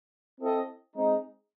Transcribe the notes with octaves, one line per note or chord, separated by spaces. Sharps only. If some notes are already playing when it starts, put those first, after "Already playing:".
C4 E4 A4 D#5
G#3 C4 D#4